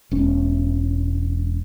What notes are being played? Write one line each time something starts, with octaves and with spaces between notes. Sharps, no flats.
E1 C#4